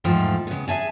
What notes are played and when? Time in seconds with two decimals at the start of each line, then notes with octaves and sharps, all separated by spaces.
0.04 E2 G#2 F3 A3 D#4 G5
0.47 C#3 B3
0.68 G#4 E5 G#5 A5